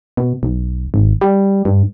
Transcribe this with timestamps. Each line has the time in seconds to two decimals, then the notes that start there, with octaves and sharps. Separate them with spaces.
0.17 B2
0.43 B1
0.94 G#1
1.21 G3
1.65 G2